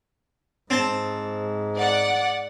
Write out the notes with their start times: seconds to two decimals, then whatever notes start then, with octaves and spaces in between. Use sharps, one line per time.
0.70 G#2 C4 A5
1.75 D5 F#5